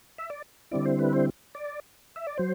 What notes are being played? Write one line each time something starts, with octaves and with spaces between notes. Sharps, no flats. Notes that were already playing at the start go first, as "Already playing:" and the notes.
E5
D5
D3 G3 C4 E4 D5
C5
B4
C5
D5
E5
D5
F#3 C5